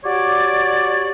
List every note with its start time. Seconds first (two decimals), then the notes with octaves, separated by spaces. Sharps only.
0.04 F#4 G4 C#5 D5